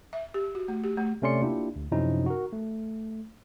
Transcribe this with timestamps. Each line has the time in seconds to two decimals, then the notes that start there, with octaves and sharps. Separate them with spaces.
0.13 E5
0.34 G4
0.55 F#4
0.68 A3
0.84 G4
0.97 A3
1.22 C3 A3 C#4 D5 C6 C#7
1.42 A#3 D4 E4 F4 G4
1.76 D2
1.92 F#2 C3 F3 C#4 D#4 E4
2.26 F#4 A#4
2.53 A3